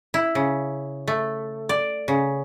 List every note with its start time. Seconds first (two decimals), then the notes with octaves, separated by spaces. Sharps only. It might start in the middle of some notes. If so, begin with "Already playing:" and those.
0.14 E4
0.35 C#3
1.08 A3
1.69 D5
2.08 C#3